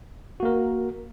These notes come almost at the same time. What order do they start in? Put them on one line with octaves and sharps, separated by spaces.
F#4 A#3 A#4